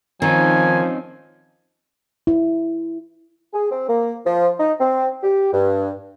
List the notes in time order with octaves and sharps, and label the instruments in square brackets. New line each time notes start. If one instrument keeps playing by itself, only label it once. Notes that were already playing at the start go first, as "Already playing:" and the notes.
[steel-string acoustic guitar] D#3 [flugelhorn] F3 [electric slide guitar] C4 C#4 D#4 [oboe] G#5
[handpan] E4
[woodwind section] G#4
C4
A#3
F3
D#4
C4
G4
G2